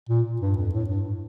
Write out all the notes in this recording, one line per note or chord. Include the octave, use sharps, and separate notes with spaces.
A#2
G2
F2
A2
G2